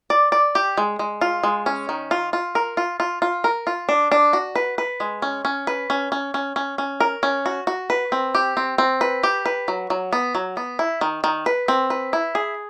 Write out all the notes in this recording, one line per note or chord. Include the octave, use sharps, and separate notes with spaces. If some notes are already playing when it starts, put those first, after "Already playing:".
D5
D5
G4
G#3
G#3
F4
G#3
C#4
D#3
F4
F4
A#4
F4
F4
F4
A#4
F4
D4
D4
F#4
B4
B4
G#3
C#4
C#4
B4
C#4
C#4
C#4
C#4
C#4
A#4
C#4
F#4
F#4
B4
C4
G4
C4
C4
B4
G4
B4
F#3
F#3
B3
F#3
B3
E4
D#3
D#3
B4
C4
B4
E4
G#4